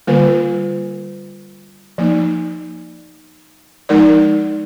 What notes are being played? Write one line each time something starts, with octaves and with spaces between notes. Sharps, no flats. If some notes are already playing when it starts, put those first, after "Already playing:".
D3 G3 A#3 F4 A#4
F3 A#3 D#4
F3 G#3 D#4 A#4 D5